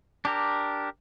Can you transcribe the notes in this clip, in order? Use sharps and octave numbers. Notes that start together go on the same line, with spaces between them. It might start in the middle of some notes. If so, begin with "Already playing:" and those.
D4 G4 A#4